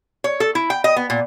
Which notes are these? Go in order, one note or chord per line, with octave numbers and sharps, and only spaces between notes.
C#5
A4
E4
G5
D#5
B3
A#2